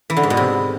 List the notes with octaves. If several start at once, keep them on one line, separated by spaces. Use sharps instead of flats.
E3
D3
G#2
B2
C3